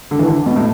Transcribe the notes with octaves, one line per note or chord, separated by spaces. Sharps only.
D3
E3
D3
B2
A2